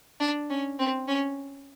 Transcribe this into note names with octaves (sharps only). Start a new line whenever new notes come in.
D4
C#4
C4
C#4